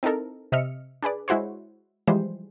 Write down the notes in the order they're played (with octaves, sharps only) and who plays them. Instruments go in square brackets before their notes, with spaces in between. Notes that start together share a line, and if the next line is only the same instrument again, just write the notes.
[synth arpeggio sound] C4 D#4 E4 A4 A#4
C3 D#5 E5 F6 C#7
D4 G#4 B4 D5
G#3 E4 F#4 C5 C#5
E3 F3 G3 G#3 C5